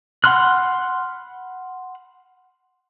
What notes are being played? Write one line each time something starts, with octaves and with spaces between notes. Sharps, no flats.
F#5 B5 C6 F6 F#6